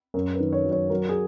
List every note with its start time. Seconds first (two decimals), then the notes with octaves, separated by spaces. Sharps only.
0.14 F#2 A#4
0.33 B4
0.40 D#3
0.53 C#5
0.64 F#3
0.72 C#5
0.90 F#3 A#4
1.09 G#4